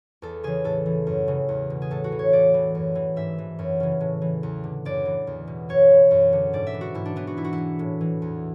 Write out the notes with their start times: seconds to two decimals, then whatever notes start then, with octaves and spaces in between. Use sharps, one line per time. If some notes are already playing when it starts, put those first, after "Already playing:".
0.22 E2 A4
0.43 C#3 E3 G#4
0.64 A2 A4
0.86 E3
1.07 F#2
1.28 C#3 E3
1.49 E2
1.70 B2
1.82 G#4
1.91 A2 A4
2.04 F#4
2.12 E3
2.19 C#5
2.33 A2 D5
2.54 E3
2.75 F#2
2.95 E3
3.16 G#2 E5
3.38 E3
3.59 F#2
3.80 C#3 E3
4.01 A2
4.22 E3
4.43 E2
4.64 D3
4.85 F#2 D5
5.05 E3
5.27 E2
5.48 B2
5.69 F#2 C#5
5.91 E3
6.11 F#2
6.33 D3
6.53 G#2 D5
6.67 E5
6.74 E3
6.81 F#4
6.94 G#2 E4
7.05 D4
7.16 E3 B3
7.27 F#4
7.37 G#2 E4
7.44 F#4
7.53 E4
7.58 E3
7.79 A2
8.01 E3
8.22 E2